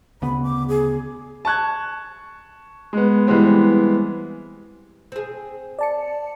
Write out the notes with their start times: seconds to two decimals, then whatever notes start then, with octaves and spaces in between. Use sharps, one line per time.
0.22 D2 C#3 B3 B5
0.43 D6
0.68 G#4
1.45 A5 C#6 F#6 G#6
2.93 G#3 B3
3.27 E3 G3 G#3 B3 C4
5.12 C4 G#4
5.79 D5 A5 C#7